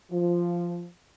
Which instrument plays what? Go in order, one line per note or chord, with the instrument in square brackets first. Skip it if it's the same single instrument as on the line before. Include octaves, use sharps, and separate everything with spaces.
[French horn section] F3